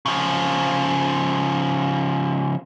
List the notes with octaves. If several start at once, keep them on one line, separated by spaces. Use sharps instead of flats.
C#3 F3